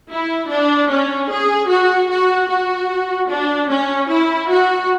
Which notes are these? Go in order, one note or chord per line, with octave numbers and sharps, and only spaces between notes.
E4
D4
C#4
G#4
F#4
F#4
F#4
D4
C#4
E4
F#4